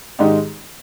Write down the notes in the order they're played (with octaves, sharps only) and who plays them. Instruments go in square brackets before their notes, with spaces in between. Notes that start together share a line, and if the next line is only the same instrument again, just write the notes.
[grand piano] G#2 D#3 G#3 D#4 G4